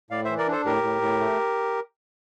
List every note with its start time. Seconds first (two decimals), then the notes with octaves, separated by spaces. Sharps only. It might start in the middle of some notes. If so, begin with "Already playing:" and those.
0.11 A2 D5 F5
0.25 E3 C5 E5
0.38 A#4 D5
0.47 D4 A4 C5
0.65 A2 G4 A#4
0.83 A2
1.02 A2
1.20 A3